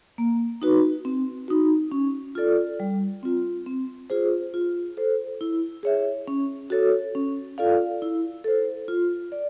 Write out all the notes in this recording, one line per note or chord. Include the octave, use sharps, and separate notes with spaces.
A#3
D#4 F#4 B4
C4
D#4 F#4
C#4
F4 A4 D5
G3
C4 F4
C4
F4 G#4 C5
F4
A4 C5
E4
G#4 C#5 E5
C#4
F#4 A4 C#5
C#4
F4 A4 D5 F5
E4
A4 C5
F4
D5